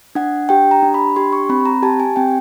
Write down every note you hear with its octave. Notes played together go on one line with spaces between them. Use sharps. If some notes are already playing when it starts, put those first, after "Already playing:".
D4 F#5
G4 G5
A#5
D4
B5
G4 C6
C#6
C4 B5
A#5
G4 A5
G#5
C4 G5